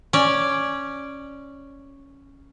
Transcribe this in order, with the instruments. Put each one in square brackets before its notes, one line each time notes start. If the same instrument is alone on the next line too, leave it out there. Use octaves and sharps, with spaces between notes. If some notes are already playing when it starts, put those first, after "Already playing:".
[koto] C#4 D5